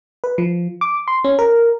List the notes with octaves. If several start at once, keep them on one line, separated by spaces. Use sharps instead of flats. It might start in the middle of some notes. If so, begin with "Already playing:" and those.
B4
F3
D6
C6
C#4
A#4